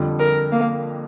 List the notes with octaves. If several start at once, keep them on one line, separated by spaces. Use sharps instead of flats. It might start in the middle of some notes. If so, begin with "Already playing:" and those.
Already playing: F2 D3 G3
A#4
A#3